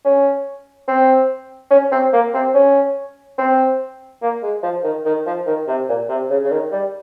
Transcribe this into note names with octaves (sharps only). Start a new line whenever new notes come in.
C#4
C4
C#4
C4
A#3
C4
C#4
C4
A#3
G#3
F3
D#3
D#3
F3
D#3
C3
A#2
C3
C#3
C#3
D#3
G3